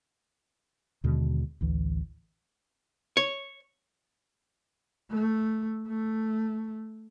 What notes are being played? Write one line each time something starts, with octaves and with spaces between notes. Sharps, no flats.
D#2 B2 D3 G#3
A1 D2 E3
C#5
A3
A3